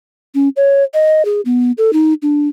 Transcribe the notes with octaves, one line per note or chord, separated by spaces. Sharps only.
C#4
C#5
D#5
G#4
B3
A4
D#4
D4